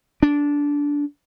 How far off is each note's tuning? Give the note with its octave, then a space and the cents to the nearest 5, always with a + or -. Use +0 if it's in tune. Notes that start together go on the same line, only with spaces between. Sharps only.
D4 -15